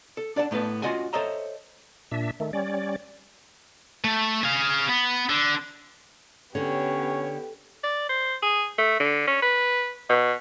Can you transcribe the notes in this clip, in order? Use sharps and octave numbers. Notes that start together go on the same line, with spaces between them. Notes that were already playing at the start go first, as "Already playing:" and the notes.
A4
D4 D5 F#5 A5
A2 A3 B3 B4 A5
C#4 F4 F#4 D#5 F#5 G#5
A4 C5 C#5 D#5 E5 A#5
A#2 D4 E5
D#3 A3
G3 C#4 D5
A3
G#4 F5
B3
D3
D3 B3 C#4 G4 C#5
D5
C5
G#4
A3
D3
C#4
B4
B2